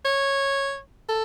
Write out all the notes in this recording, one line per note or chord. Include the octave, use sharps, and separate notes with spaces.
C#5
A4